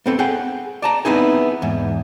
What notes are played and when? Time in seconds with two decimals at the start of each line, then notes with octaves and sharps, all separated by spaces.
0.06 B3 C4 A4
0.19 G#4 F#5 G5
0.82 D5 A5 A#5
1.05 B3 C4 D#4 E4 G#4
1.62 E2 G#2